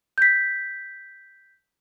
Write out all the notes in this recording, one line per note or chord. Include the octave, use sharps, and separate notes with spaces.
G6 B6